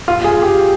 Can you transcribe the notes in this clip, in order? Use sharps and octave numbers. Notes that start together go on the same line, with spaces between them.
F4
G#4
G4